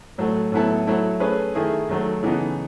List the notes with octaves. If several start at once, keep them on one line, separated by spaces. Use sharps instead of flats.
A2 F#3 A3
A2 F#3 B3 E4 A4
F#3 A3 E4
A3 C#4 G#4 B4
D#3 A3 E4 G#4
D#3 F#3 A3
C#3 E3 B3 D#4 A4